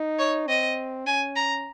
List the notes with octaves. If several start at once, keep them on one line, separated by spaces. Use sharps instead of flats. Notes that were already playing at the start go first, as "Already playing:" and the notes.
Already playing: D#4
C#5
C4 D#5
C#4 G#5
A#5